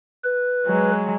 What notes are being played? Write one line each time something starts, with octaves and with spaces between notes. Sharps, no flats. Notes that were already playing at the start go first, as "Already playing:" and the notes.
B4
F#3 G#3